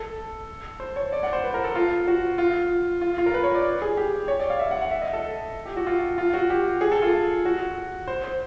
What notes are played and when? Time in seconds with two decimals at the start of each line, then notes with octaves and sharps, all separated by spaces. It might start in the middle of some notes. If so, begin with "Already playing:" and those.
Already playing: A4
0.80 C5
0.96 C#5
1.12 D5
1.23 F#5
1.33 C5
1.44 B4
1.54 A#4
1.64 A4
1.75 F4
2.08 F#4
2.38 F4
3.01 F4
3.18 F4
3.26 A#4
3.34 B4
3.43 C#5
3.54 D5
3.82 G#4
3.97 G4
4.28 C#5
4.40 D5
4.50 F5
4.59 E5
4.71 F#5
4.81 F#5
4.91 E5
5.02 D#5
5.13 A4
5.65 G4
5.77 F#4
5.87 F4
6.18 F4
6.34 F#4
6.50 G4
6.81 G#4
6.92 A4
7.02 F4
7.45 F#4
8.08 C5
8.24 C5